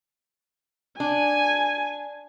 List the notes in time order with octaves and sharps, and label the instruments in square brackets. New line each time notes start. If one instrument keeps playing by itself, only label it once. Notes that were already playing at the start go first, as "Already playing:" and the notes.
[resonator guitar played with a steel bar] D4 [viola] G#5